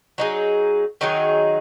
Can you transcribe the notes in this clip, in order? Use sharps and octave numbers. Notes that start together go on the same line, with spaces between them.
F#3 D#4 G#4
D#3 F#3 D#4 G#4